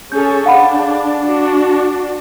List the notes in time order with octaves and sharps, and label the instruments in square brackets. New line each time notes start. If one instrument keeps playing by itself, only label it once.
[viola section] C#4 G#4 A4 [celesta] G6
[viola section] D4 [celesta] F5 F#5 B5
[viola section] D4 F#4